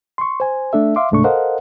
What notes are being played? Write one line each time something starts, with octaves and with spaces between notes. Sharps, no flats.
C6 C#6
C5 G#5
A3 D4 A4 E5
E5 F5 C6 D6
C#2 G#2 C3 A3 D4 C#6
A4 A#4 C5 D#5 F5 F#5